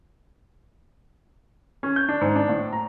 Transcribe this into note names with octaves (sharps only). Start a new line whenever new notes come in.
C#4
G6
D4
G#2
D4
A2
A#5